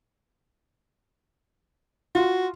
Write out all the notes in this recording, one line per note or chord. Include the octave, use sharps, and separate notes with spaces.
F4 F#4